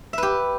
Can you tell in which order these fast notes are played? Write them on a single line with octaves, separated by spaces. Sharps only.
E5 B4 G4